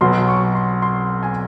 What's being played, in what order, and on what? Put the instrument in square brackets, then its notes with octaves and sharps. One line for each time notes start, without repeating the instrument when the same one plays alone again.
[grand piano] B1 B2 F#3 B3 C6
C#6
C6
C6
G#5